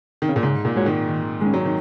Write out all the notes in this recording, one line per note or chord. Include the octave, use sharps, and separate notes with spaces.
D#3
C#3
A#2
G#2 C#3
A#2
G#3 F#4 C#5
D#3
D#3
D#3 G#3 C#4
F#3
D#3